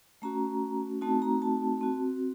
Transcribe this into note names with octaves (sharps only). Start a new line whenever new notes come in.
A3 C#4 F#4 A#5
A3 C4 D#4 F#4 A5
A#5
A5
C4 F#4